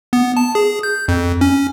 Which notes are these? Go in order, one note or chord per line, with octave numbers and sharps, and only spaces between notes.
B3
A5
G#4
G6
F2
C#4